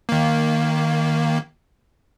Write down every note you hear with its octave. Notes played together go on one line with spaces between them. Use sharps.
D#3 A#3